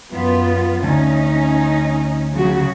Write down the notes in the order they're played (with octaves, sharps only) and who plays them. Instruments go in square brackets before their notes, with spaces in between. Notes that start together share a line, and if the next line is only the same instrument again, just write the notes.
[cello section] F#2 B3 F4
[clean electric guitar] D2 [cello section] C#4 D#4
[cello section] C#3 F#3 F#4